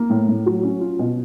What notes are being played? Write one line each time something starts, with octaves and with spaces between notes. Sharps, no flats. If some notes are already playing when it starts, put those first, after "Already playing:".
Already playing: A#3
A2
A2
F#3
C#4
F4
B2